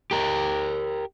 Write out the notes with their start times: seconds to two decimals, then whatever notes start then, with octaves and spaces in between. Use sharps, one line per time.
0.11 G4 A#4